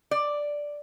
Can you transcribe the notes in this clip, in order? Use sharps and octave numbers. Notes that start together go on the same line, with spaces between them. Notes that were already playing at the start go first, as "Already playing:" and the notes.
D5